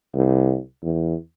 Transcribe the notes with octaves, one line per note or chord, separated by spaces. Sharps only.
C2
E2